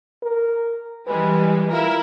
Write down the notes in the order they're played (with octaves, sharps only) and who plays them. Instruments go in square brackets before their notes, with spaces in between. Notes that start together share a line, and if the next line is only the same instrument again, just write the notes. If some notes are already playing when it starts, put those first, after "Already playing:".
[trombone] A#4
[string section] E3 G3 G#3 [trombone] B4
[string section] E4 A#4 [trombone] F4